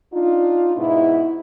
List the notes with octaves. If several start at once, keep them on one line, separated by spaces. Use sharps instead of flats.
D4 D#4 F4
G#2 B2 E4